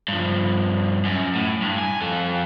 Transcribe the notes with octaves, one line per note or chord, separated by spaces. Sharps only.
G2 F3
F#2
A2
G2
G#5
F2 A4